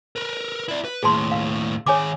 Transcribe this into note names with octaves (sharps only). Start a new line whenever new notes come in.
A#4 B4
E4 D5
B4
D#2 A2 G#4 A5 C6
F5
D#3 G#4 C#5 G#5 D6